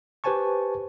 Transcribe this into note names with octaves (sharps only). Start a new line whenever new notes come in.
G4 B4 C5 G#5 A5 C#6